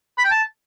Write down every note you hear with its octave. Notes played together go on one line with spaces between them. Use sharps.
B5
G5
A5